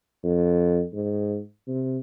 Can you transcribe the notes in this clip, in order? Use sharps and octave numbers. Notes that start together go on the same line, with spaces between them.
F2
G#2
C3